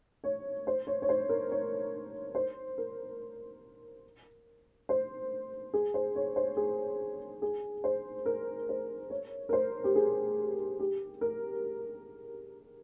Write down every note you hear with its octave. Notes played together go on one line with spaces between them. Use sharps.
C#5
C5
C#5
C#5
C5
A#4
C#5
C5
A#4
C5
G#4
C5
C#5
C5
G#4
G#4
C5
A#4
C5
C#5
A#4
C5
G4
G#4
G4
A#4